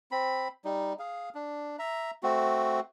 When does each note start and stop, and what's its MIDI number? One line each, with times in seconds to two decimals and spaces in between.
0.11 0.48 60
0.11 0.48 83
0.65 0.93 55
0.65 0.93 63
0.99 1.29 68
0.99 1.29 77
1.35 1.76 62
1.79 2.11 76
1.79 2.11 82
2.23 2.80 57
2.23 2.80 60
2.23 2.80 66